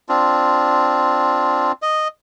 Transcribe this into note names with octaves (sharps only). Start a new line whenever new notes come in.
C4 D4 F4
D#5